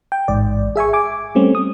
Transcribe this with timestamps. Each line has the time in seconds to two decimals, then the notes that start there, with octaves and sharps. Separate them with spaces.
0.12 G5
0.28 A1 G#2 D5
0.76 G#4 E5 G#5 C#6
0.93 G#5 D6
1.35 G3 A3 C4 C#4
1.55 D#6